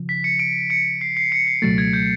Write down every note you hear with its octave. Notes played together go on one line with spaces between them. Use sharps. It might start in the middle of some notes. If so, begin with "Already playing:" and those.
Already playing: C#3 F3
B6
C#7
D7
C#7
C7
C7
C#7
C7
C#2 B2 F#3 A3 A6
G#6
G6